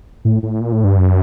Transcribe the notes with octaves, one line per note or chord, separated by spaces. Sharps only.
A2
A2
A#2
A2
G2
F#2